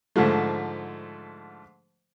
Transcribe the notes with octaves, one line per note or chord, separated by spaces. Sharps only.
G#2 D3 F3 A3